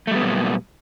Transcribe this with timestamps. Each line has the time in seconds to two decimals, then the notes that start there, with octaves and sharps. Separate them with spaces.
0.07 A3
0.11 G3
0.15 B3
0.19 F#3
0.23 A#2